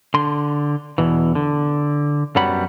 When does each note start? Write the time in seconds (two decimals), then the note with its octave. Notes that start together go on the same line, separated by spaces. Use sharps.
0.14 D3 C6
0.98 E2 B2 E3
1.35 D3
2.36 F#2 F#3 G3 B3 F#5 B5